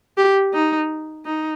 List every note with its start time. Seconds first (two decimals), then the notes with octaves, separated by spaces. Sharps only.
0.18 G4
0.54 D#4
1.25 D#4